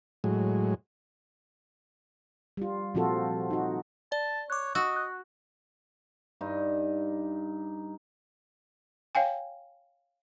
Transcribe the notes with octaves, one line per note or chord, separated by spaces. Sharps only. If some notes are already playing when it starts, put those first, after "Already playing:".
A2 F#3 G#3
G3 F4
A#2 F3 C4 F4 F#4 A4
D#4 F#4
D5 A5
C#5 D6 F#6
F#4 D#5 E6
F#6
G2 D#4
C#5 F5 G5 G#5